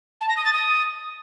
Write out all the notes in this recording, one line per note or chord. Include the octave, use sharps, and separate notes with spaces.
A5
A#6
D#6
A6
D#6